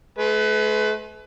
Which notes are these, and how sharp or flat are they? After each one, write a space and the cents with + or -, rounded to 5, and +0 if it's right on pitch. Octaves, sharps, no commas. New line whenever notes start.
A3 -45 B4 +25